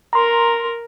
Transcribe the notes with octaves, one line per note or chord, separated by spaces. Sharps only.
A#4 A#5 C6